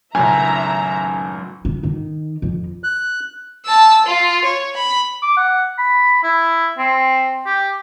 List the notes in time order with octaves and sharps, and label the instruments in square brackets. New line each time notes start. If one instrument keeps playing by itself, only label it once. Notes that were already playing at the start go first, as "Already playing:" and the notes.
[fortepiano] G#1 C#2 [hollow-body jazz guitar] F#2 A2 D#3 [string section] E5 A#5 [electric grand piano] G#5
[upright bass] D#3
D#3
F2
[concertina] F#6
[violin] A5 E6
F4
C#5
B5
[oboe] D6
F#5
B5
E4
C4
G4